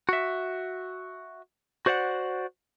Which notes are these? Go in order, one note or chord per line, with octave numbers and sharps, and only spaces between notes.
F#4 E5
F#4 C5 D5 F5 F#5